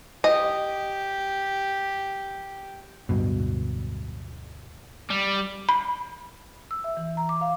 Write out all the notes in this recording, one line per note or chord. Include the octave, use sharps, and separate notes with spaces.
G4 D#5
D1 G2 B2
G3
B5
E6
E5
E3
A#5
D6
F5